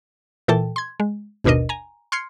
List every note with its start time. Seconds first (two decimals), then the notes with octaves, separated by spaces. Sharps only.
0.48 A#2 E3 A4 G5 A5
0.76 C6 G#6
1.00 G#3
1.44 G#1 D#2 B2 D4 A#4 D#5
1.69 G#5 A#5
2.12 C6 F6 G#6 C7 C#7